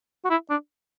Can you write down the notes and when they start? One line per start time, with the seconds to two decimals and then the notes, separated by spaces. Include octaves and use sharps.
0.25 F#4
0.30 E4
0.50 D4